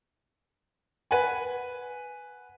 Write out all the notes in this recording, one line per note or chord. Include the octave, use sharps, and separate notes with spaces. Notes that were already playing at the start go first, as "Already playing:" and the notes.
B4 F#5 G#5